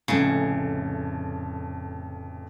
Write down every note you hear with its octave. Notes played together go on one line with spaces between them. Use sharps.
F1 F2 A2 C#3